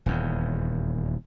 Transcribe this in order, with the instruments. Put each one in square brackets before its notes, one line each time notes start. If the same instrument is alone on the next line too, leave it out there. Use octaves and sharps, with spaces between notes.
[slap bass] D#1 E2